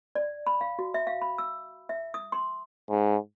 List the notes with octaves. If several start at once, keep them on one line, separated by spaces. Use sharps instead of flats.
D5
B5
F5
F#4
E5
F5
B5
E6
E5
D#6
C6
G#2